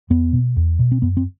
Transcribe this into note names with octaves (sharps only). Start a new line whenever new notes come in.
E2 B3
B2
E2
B2
C4
F#2 B3
C4